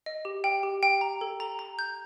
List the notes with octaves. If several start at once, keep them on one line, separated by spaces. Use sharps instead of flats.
D#5
G4
G5
G4
G5
A#5
A4
A#5
A#5
G6